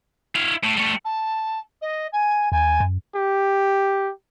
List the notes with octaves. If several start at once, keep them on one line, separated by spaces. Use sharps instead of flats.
E4 F5
A2
G3 A3
A5
D#5
G#5
D#2 G#5
F#2
G4